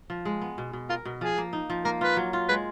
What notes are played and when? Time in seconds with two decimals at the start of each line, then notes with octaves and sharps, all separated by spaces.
0.10 F3
0.25 G#3
0.41 B3
0.58 B2
0.73 B2
0.89 F4 A#4
1.05 B2
1.21 F3 G#4
1.38 A#3
1.53 D#4
1.70 F3
1.85 A#3 A#4
2.01 F4 B4
2.17 F#3
2.33 F4
2.49 G#3 B4